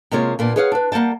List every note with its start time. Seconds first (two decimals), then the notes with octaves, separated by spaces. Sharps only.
0.11 C3 G#3 A#3 F4 C#5
0.39 A#2 A#3 B3 D4
0.56 G#4 B4 C#5 D5 F5 F#5
0.72 D4 B4
0.92 G3 A#3 F#5 G5 A5